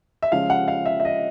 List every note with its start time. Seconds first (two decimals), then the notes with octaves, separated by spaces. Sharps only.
0.22 E5
0.31 C#3 F3 G#3 C#4 F5
0.50 F#5
0.68 F5
0.86 E5
1.00 E5
1.05 D#5